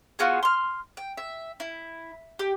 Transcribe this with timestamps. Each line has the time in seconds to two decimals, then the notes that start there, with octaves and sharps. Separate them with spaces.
0.19 B3 F4 F#4 G#4
0.43 C6 F6
0.97 G5
1.17 E5
1.60 E4
2.39 G4